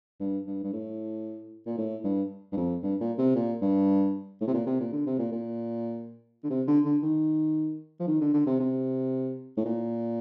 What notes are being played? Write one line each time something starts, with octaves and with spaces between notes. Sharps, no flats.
G2
G2
G2
A2
A#2
A2
G2
G2
F2
G2
A#2
C3
A#2
G2
A2
C3
A#2
C3
A#2
D3
C3
A#2
A#2
D3
C3
D3
D3
D#3
F3
D#3
D3
D3
C3
C3
A2
A#2